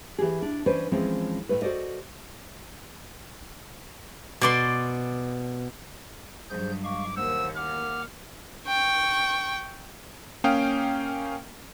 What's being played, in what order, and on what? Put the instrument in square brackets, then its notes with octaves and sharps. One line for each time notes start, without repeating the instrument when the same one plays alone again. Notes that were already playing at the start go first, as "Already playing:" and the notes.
[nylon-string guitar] E3 G4 G#4
D4
E3 C#4 B4 C5 D5
E3 F3 G#3 C4 C#4
A2 A3 B4
F#4 A4 C5 D5 D#5
[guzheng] B2 D5 C6
[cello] G2 F#3 [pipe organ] G#4 C5 G6
[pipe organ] G#3 F5 C#6 [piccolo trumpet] D6
[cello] D#2 A#3 [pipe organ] C5 F#5 [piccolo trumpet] E6
[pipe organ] F#5 D6 [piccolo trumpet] F6
[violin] G5 C#6
[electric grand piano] A#3 C#4 F5 G5 D#6 D7